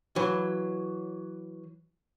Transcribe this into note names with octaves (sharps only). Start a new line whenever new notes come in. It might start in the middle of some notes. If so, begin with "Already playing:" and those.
E3 F#3